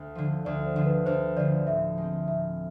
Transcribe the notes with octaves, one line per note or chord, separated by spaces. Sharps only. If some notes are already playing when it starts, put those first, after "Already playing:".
Already playing: D2
D3 F3
D2 D5
C5
D3 F3
B4
D2 C5
D3 F3 D5
A2 E5
G#3 C4
A2 E5